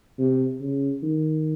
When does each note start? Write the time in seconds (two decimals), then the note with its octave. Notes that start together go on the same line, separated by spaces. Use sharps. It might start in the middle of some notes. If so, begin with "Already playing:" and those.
0.18 C3
0.60 C#3
1.03 D#3